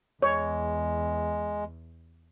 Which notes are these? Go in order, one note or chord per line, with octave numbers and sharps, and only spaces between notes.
E2 G#3 C#5